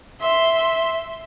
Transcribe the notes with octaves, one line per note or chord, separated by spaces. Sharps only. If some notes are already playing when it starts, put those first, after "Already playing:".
E5 C6